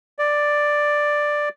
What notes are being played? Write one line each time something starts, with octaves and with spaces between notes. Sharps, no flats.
D5